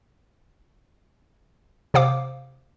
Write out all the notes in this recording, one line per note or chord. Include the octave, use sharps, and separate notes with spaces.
C3 C5 F5 D6